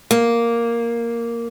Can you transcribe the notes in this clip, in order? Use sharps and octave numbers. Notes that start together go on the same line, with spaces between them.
A#3